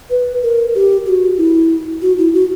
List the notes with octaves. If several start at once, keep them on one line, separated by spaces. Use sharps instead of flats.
B4
A#4
G4
G4
F#4
E4
F#4
E4
F#4